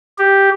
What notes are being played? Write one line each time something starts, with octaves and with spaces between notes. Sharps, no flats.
G4